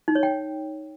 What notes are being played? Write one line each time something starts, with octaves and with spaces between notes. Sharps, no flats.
D#4
C#5
G5